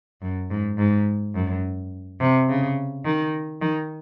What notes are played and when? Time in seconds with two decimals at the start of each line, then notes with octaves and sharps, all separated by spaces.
0.22 F#2
0.50 G#2
0.78 G#2
1.35 F#2
2.20 C3
2.49 C#3
3.05 D#3
3.62 D#3